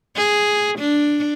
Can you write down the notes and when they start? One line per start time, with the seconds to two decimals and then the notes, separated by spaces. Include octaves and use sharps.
0.16 G#4
0.79 D4